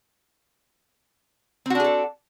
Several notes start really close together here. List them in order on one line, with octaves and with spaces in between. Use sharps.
C4 F#4 D4 G#4 A4